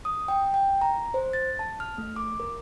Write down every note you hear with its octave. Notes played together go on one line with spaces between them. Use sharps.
D#6
G5
G5
A#5
C5
A6
A5
F6
A3
D6
A#4